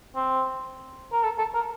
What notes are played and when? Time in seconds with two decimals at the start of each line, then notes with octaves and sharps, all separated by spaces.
0.16 C4
1.13 A#4
1.24 A4
1.39 A4
1.55 A#4